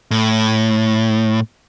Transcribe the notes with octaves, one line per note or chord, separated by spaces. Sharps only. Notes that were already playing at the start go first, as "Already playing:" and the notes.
A2